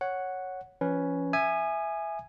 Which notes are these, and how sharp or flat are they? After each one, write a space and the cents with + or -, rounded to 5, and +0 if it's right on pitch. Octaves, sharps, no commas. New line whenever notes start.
C#5 +0 F#5 +0
F3 -30 C#4 +5 B4 -5
E5 +0 G#5 +0 D#6 -40